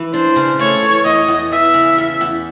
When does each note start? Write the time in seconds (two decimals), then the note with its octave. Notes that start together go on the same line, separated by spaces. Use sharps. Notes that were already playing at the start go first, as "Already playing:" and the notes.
Already playing: E3
0.14 D4 C5
0.36 C#3
0.59 A3 C#5
0.83 E3
1.05 E2 D#5
1.28 E2
1.52 E3 E5
1.74 C#3
1.98 E2
2.21 E2